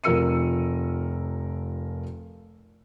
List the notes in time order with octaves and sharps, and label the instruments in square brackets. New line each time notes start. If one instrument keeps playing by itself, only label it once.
[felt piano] F1 F3 A#4 E6 C#7 D#7